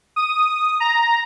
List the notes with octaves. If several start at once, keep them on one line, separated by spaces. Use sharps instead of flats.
D#6
A#5